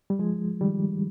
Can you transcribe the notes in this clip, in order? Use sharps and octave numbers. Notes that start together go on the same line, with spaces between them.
G3
F3 G#3
D#3 G3